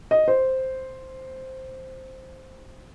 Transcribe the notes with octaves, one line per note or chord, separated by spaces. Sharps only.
D#5
C5